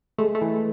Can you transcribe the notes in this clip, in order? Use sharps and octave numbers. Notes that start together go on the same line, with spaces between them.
G#3 A3
A3
E3